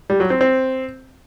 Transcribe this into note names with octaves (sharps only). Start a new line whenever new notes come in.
G3
F#3
C4
C4